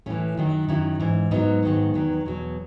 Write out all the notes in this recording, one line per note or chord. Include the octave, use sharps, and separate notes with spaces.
A2 E3 A3 C#4
F#2 D#3 F#3
F#2 D#3 F#3 C#4 E4
G#2 E3
G#2 F#3 B3 D#4
G#2 D#3 F#3
E2 D#3 F#3
E2 B2 F#3